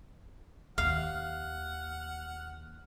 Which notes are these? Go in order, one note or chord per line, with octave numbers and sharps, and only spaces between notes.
D#2 F5 F#5 F6